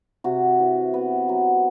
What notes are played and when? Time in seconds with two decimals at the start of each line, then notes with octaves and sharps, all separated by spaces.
0.24 C3 F#4
0.59 E3
0.94 B3
1.29 F#3